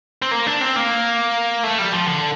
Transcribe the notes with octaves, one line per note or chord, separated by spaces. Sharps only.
C4
A#3
D4
C4
A#3
A3
G3
F3
D3